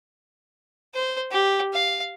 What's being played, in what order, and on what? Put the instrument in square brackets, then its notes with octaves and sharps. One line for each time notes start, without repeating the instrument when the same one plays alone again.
[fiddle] C5
G4
F5